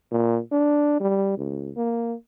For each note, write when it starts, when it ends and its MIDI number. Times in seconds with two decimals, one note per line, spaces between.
0.11 0.39 46
0.52 0.99 62
1.01 1.33 55
1.38 1.71 37
1.77 2.14 58